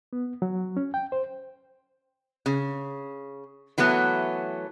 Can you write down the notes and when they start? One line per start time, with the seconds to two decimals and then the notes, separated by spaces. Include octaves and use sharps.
0.13 B3
0.42 F#3
0.77 C#4
0.94 G5
1.12 C5
2.46 C#3
3.78 E3 F#3 A3 B3